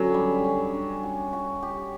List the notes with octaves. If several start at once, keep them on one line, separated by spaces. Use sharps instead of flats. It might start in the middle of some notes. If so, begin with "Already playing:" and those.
Already playing: D3 F#3 C#4
G3
C#4
D4
F#4
F#4
G4